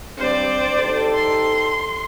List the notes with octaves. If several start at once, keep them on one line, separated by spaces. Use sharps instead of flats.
G2 G3 C4 C5 D5
D#4 G4 A4
C6